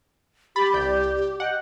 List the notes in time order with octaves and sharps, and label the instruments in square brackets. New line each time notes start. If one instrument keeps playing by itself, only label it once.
[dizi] G4 [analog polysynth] B5 A6
[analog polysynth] C2 D5 G6
[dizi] D#5 [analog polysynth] F#5 G5